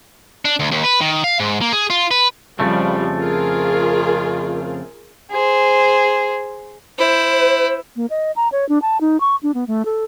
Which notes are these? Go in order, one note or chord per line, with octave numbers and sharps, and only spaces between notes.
D4
D2
D#2
B4
D#3
F5
G#2
A#3
G#4
F4
B4
F2 C#3 F3 G3 A3
F4 G#4 A#4
G#4 C5
E4 C5
A#3
D#5
A#5
C#5
D4
A5
D#4
C#6
D4
B3
A3
A4